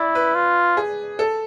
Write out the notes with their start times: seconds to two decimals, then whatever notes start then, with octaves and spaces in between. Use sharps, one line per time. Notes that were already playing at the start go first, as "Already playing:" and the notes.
Already playing: E4 D5
0.15 B4
0.35 F4
0.77 G#4
1.19 A4